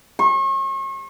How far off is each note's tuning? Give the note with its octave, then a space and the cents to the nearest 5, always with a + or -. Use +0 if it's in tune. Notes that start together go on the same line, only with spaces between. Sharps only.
C#6 -40